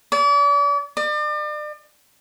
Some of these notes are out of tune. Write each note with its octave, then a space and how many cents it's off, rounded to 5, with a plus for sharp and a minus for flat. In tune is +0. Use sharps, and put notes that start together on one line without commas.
D5 -40
D5 +40